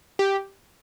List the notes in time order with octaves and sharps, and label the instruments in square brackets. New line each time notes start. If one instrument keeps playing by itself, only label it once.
[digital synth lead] G4